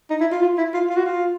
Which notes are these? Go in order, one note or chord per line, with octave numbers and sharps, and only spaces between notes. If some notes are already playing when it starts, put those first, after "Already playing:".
D#4
E4
F4
F4
E4
F4
F4
F#4
F4